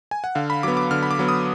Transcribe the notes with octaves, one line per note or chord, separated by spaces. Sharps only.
G#5
F#5
D3 F5
B5
F#3 B3 D6
D6
D3 F6
B5
D6
F#3 B3
D#6